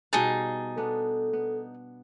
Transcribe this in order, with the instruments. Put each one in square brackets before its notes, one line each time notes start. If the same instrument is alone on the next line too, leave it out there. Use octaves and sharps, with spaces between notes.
[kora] B2 G3 F5 [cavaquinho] D#4 G#4 A5
[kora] B3 D4 [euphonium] A4
[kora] B3